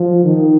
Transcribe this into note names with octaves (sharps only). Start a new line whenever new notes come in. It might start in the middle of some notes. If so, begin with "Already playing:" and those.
Already playing: F3
D#3